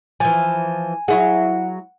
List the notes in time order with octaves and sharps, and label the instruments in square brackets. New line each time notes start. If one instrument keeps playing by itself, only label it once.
[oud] E3 F3 [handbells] G#5
[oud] F#3 E4 G#4 [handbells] F#5